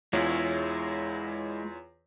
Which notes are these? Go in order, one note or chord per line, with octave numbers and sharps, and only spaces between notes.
E2 G#3 E4 F4 C#5